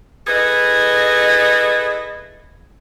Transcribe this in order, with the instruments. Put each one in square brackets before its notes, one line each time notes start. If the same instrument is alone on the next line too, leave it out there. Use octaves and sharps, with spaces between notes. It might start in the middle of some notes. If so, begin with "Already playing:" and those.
[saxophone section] E4 G#4 A4 B4 D#5